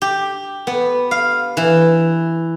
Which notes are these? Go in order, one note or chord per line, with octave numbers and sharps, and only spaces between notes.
G4
B3
F5
E3